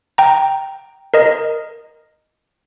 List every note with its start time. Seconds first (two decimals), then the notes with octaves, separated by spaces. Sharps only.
0.18 G5 A#5
1.14 A#4 D#5